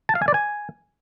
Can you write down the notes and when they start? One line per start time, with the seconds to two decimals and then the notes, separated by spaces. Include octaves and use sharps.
0.09 A5
0.15 F5
0.22 G#5
0.28 D5
0.34 G#5